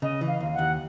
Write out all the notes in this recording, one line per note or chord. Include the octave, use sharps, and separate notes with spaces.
C#3 D#5
E3
F5
D#2
F#5
D#2